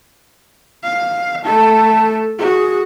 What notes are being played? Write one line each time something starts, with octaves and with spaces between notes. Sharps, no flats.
F5
A3 A4 A5
F#4 G#4